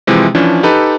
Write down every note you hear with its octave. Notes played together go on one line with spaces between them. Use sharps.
C3 E3 F3 G#3
E3 F3 C#4 D4
D#4 G4 A4 B4